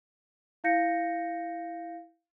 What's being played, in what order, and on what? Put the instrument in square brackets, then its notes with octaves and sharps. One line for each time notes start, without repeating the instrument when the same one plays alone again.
[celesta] E4 F5 G6 A#6 C#7